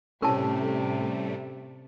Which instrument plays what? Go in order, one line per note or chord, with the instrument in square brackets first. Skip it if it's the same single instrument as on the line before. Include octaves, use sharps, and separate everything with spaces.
[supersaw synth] A2 G3 A3 [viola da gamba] C3 [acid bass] C#4 [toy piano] A#4 A5